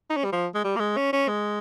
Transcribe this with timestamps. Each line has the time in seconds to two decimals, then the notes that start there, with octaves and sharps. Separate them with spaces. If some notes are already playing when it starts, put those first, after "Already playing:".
0.10 D#4
0.17 C#4
0.25 G3
0.33 F3
0.55 G#3
0.64 G3
0.76 A#3
0.80 G#3
0.97 C#4
1.13 C#4
1.28 G#3